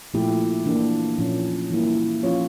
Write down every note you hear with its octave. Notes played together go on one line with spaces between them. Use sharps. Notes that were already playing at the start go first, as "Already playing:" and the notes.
A#2 F3 A3 E4 G4
E3 A#3 D4
A#2 F3 C#4
E3 G3 A#3 E4
F3 C#4 F4 C#5